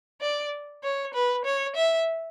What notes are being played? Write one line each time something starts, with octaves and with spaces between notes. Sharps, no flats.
D5
C#5
B4
C#5
E5